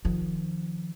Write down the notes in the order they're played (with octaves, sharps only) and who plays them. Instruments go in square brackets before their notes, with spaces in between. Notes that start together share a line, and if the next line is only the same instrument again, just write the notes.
[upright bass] D#3 F3